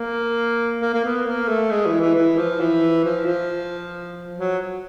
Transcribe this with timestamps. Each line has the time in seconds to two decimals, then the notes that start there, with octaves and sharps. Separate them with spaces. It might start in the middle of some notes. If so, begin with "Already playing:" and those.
Already playing: A#3
0.81 A#3
0.94 A#3
1.04 B3
1.26 A#3
1.48 A3
1.70 G#3
1.86 E3
2.01 E3
2.15 E3
2.38 F3
2.60 E3
3.04 F3
3.27 F3
4.38 F#3